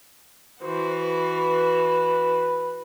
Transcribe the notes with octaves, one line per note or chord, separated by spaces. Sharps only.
E3 F#4 C5
B4